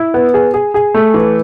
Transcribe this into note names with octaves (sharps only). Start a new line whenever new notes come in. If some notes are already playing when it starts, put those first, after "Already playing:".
Already playing: E4
B3
G#4
G#4
G#4
A3
E3